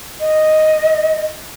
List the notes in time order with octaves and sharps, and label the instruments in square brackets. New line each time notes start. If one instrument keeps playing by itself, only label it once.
[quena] D#5